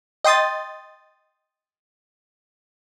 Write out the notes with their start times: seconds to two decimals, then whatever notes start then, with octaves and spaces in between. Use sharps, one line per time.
0.25 D#5 G5 C6 D#6 A6